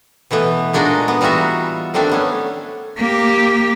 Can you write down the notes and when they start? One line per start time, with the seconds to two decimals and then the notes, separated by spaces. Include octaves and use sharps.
0.31 B2 E3 A3 B3
0.73 A#2 G#3 D4 D#4 F#4
1.08 B3
1.21 E3 G3 D#4 F4 F#4 E5
1.94 D#3 G3 A3 C4 D4 E5
2.09 A3 B3 C#4
2.97 A#3 G4